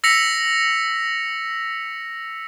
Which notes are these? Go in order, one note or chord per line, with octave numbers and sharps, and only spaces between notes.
E6 A#6 B6 C#7 F7